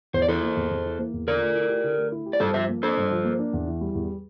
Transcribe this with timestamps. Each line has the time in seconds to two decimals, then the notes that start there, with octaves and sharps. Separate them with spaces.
0.14 E2 C5
0.22 D5
0.28 E3 A4 C5
0.43 A#3
0.57 E2
0.71 E2
0.85 E3
0.99 A#3
1.13 E2
1.27 D3 A#4 D5
1.42 A3
1.55 E4
1.69 G4
1.84 D3
1.98 A3
2.12 E4
2.26 G4
2.33 D5
2.40 G2 A4 C5
2.54 F3 C5 E5
2.69 A#3
2.83 D4 A4 C5
2.97 G2
3.11 F3
3.25 A#3
3.39 D4
3.53 E2
3.67 E3
3.81 G3
3.95 E2